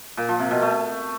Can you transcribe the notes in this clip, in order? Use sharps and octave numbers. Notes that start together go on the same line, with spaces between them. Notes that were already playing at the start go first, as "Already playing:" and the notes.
A#2
F3
C3
B2
A3